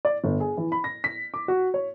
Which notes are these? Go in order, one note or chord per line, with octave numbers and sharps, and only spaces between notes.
D5
G1
G#4
E3
B5
A#6
B6
D6
F#4
C#5